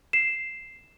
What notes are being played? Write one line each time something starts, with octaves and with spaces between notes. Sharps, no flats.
C7 E7